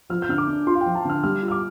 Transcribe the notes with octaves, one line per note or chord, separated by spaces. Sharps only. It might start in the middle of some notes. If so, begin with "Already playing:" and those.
F3 F6
G6
D3 F6
D6
D4
F4 C6
F5
G5
F3
A5
D3 F6
G3 F6
F4
F6
D6